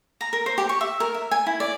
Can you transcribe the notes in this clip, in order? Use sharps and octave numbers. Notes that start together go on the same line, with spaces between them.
A#5
A#4
C5
G4
C#6
E5
A#4
E5
G#5
E4
D5